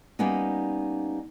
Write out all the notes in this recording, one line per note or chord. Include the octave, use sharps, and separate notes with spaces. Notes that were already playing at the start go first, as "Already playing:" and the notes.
G3 A#3 B3 C#4 D#4